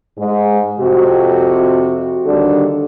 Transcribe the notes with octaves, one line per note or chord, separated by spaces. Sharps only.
G#2 G#3
F2 C3 F#4
D#2 D3 G3 D4 A4